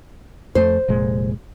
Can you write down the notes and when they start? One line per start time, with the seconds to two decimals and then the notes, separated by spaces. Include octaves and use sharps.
0.55 F2 A3 C5
0.88 F1 A#2 G#3